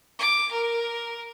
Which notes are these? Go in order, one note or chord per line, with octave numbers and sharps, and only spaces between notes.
D6
A#4